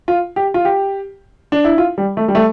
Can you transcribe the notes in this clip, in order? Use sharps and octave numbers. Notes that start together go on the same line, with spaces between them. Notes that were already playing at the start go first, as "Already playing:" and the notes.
F4
G4
F4
G4
D4
E4
F4
G3
A3
G3
A3